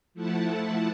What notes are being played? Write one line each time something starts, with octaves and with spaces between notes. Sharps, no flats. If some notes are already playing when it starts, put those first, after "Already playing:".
F3 A3 E4 F#5 A5